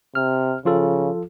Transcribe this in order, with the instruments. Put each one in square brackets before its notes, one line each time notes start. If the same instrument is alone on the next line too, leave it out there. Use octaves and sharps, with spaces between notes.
[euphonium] C3 [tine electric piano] F6
[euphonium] C#3 [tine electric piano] F3 F4 A4